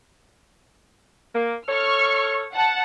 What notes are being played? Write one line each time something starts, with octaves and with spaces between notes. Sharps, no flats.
A#3
A4 C#5 C#6 F6
F#5 A5